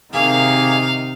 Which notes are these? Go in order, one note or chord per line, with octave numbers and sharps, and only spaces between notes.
C3 D#3 A#3 G#4 F5